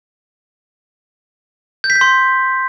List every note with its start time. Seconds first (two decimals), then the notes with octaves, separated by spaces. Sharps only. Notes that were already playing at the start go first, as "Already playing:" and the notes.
1.84 G6
1.90 B6
1.96 G6
2.01 C6